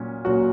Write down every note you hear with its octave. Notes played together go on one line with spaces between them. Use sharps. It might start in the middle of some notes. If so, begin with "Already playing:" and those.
Already playing: A#2 F#3 C#4
A#2 F#3 C#4 F#4